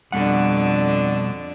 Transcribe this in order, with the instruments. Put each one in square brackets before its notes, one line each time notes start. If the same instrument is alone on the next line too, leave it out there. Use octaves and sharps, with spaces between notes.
[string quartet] F2 D3 D4 [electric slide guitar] B2 G3 F#5